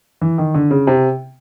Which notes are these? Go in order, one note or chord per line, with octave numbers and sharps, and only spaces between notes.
E3
D#3
D3
C#3
C3